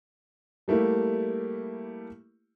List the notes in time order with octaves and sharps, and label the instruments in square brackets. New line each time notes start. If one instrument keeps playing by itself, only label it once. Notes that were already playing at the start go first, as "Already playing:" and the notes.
[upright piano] G3 A3 A#3 E4 G4